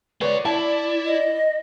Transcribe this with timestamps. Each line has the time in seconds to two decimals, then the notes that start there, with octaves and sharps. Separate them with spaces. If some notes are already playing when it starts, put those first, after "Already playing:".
0.21 G#3 B4 C#5 D5
0.45 E4 A5
1.06 D#5